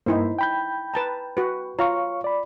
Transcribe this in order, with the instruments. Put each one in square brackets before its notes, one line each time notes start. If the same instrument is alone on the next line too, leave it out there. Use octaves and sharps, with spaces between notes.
[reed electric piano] G2 A#3 [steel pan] D#4 E4 C5
[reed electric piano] G5 B5 G6
[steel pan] B4 A5 A#5
F#4 B4
[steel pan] F4 A#5 [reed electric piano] C#5 F5 C#6
[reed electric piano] D5 B5